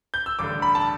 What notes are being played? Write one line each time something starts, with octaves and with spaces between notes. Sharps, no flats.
G6
E6
A1 G2 D3 D6
B5
A5